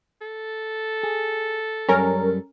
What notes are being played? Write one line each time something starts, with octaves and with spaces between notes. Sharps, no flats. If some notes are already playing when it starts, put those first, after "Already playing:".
A4
G#4
F#2 G3 C#4 A#4